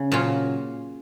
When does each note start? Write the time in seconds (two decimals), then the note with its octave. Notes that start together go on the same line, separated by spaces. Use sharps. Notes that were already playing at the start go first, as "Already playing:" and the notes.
Already playing: C#3
0.12 A#2 F#3 C#4 F4